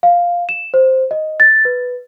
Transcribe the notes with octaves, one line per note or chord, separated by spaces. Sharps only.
F5
E7
C5
D#5
A6
B4